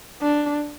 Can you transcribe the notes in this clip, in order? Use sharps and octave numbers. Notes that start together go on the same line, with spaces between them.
D4